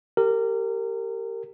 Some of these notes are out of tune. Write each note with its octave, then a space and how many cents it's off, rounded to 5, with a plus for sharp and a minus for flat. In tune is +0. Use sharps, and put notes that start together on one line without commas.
G4 +0 A#4 -25